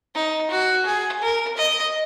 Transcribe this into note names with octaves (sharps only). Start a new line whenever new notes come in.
D#4
F#4
G#4
A#4
D#5